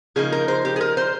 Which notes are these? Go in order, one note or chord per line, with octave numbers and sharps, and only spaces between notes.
C#3 F3 A#3 D#4 G#4
A#4
C5
G4
G#4
A#4
C5